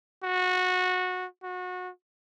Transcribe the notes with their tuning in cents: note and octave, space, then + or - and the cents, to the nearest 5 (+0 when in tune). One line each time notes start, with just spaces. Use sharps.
F#4 -20
F#4 -25